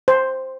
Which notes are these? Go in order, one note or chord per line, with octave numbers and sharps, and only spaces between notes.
C5